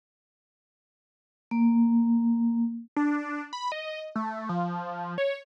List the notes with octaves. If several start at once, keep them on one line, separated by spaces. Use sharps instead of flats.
A#3
D4
B5
D#5
A3
F3
C#5